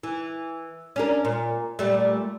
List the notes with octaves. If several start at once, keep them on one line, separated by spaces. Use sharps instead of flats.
E3
C#4 D4 A#4
A#2
A#2 G3 A3